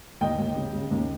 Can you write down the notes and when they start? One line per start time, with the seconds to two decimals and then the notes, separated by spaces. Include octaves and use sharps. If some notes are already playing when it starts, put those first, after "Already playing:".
0.21 D#2 D#5 G5
0.38 D#2
0.56 C#3
0.73 C#3
0.91 D#2